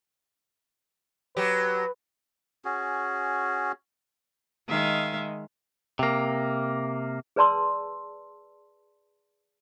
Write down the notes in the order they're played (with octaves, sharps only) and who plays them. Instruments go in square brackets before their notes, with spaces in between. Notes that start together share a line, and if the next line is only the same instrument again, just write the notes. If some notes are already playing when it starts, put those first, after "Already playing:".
[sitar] F#3 G4 [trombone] B4
[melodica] C#4 F#4 G#4
[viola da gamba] D#3 G#3 [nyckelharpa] E5 F5
[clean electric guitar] C3 A#3
[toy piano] G#4 B4 D5 A5 C6 E6